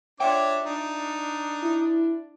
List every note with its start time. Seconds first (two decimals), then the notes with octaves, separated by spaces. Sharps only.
0.20 D4 F4 C#5 E5 F#5 G5 D6
0.66 D4 D#4
1.63 E4